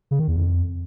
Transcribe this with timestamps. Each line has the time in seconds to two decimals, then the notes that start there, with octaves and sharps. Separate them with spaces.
0.11 C#3
0.19 D#3
0.28 E2
0.36 F2